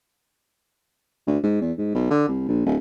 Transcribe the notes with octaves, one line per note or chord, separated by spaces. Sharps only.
D2
G#2
E2
G#2
B1
D3
C2
A#1
D1